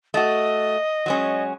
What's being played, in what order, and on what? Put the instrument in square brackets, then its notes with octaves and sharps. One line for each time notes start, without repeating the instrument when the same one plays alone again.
[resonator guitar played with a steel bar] A3 F#4 [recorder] D#5
[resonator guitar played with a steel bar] F#3 G#3 C#4